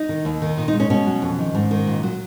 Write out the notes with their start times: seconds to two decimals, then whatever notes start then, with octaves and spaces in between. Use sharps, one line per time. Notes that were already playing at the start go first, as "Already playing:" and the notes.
Already playing: D#4
0.09 D#3
0.25 D#2
0.42 D#3
0.57 A#2 D#4
0.68 D#4
0.73 G#3
0.80 C#4
0.90 B2 C#4
1.07 F#3
1.22 F2
1.38 D#3
1.55 G#2
1.71 D#3
1.87 A#2
2.03 F#3